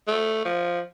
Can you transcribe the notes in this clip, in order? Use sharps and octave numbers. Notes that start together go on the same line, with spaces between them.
A3
F3